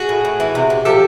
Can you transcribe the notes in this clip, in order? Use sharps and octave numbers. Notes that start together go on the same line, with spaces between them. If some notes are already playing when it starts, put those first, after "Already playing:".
Already playing: F#4 G#4
A2
A2
E3
C3
C3
F3 G4 A4